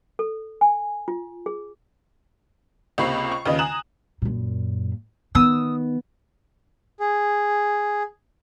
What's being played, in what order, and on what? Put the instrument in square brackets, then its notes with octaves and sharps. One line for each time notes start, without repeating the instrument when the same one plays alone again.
[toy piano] A4
G#5
F4
G#4
[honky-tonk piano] C#2 C3 A#3 B5 C#6 C7
C#6
D#2 C#3 F4 B4 D#5
G#5 A#5 D#6 F#6 E7 F#7
[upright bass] F#2 A#2
[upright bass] D#3 [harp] B3 [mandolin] D#6 E6
[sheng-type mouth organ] G#4